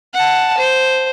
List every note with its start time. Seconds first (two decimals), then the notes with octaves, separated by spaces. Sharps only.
0.14 F#5 A5
0.58 C5